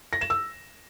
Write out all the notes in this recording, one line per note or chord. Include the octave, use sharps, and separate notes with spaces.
A#6
E7
E6